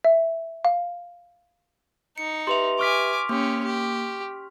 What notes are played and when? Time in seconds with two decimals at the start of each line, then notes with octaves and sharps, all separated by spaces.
0.05 E5
0.65 F5
2.18 D#4 C#7
2.47 G4 B4 E5 C6 F7
2.79 G#5 C#6 D6 F6 B6
3.29 A#3 C#4 G4
3.65 G4